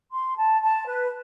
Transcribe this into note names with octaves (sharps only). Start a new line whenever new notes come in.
C6
A5
A5
B4